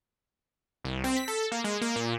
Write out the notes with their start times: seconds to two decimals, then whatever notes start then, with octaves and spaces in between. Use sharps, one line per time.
0.84 C2
1.04 C4
1.16 B6
1.28 A4
1.52 A#3
1.64 G#3
1.81 A#3
1.96 A#2